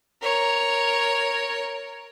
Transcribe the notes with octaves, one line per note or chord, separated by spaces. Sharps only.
A#4 C#5